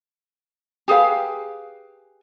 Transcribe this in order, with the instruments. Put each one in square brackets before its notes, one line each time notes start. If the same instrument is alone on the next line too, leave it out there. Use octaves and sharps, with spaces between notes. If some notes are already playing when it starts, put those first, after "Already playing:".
[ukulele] G4 G#4 B4 F5